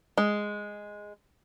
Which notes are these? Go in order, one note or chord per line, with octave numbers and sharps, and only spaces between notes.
G#3